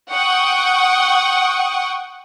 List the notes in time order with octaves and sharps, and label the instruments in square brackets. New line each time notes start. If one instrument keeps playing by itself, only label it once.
[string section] F#5 G5 C#6 D#6